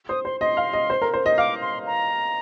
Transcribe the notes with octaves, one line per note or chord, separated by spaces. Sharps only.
C5 D#6
C5 C6
D#5 C6
F5
D#5
C5
A#4
C5
D#5
F5 D6
C6
A#5